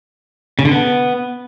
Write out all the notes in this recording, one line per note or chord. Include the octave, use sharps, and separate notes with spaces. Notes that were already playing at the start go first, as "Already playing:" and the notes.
C#3
D3
B3